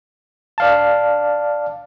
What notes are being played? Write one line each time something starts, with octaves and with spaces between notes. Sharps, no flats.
D5 F5 A5